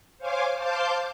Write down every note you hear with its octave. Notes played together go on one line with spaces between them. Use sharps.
C5 C#5 F5 G#5 C6 D6
C5 F5 A5 C6 D6 G6